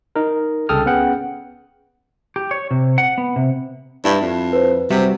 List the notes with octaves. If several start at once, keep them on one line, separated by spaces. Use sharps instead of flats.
D#4 A#4
C2 C#3 A4 G5 D#6 F6
B3 C#4 G#4 F#5 G5
G4
C#5
C3
F#5
B3
C3
G2 E4
F2
B4 C5
C3 G3 F#4 E5